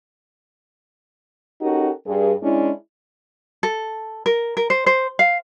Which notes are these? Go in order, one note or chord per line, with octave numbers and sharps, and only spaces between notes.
C#4 D#4 F#4 G4 A4 A#4
G2 G#4
G#3 C#4 D4 E4
A4
A#4
A#4
C5
C5
F5